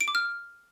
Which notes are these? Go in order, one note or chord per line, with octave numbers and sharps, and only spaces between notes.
D7
D6
F6